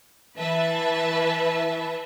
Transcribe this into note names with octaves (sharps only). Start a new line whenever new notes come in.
E3 B4 E5 A5